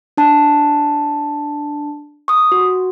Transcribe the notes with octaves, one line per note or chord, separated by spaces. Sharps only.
D4 A5
C#6 D#6
F#4